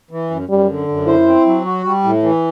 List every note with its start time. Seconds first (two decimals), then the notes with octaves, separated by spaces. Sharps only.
0.11 E3
0.30 F#2
0.49 F#2 G3
0.68 D3
0.88 F#2
1.07 E4 C5
1.26 C4
1.46 F#3
1.65 F#4
1.84 G3
2.04 A2
2.23 E3